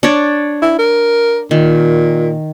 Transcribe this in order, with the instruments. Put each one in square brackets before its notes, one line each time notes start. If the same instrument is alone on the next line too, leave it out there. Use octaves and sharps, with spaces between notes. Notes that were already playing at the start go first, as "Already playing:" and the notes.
[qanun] D4 C#5 D5
[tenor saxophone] E4
A#4
[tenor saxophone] A#2 [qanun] D#3